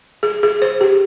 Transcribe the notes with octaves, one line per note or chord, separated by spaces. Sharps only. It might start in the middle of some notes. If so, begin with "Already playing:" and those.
G#4
G#4
C5
G4